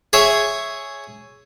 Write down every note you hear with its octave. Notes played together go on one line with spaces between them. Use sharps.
G#4 C#5 E5